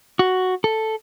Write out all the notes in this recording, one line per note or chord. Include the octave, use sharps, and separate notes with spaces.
F#4
A4